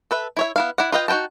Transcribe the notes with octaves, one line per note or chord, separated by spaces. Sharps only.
A4 B4 E5
E4 C#5 E5
B3 E4 F5
E4 D5 F#5
F4 B4 D#5 F5 G5
D#4 F#4 B4 G5 A5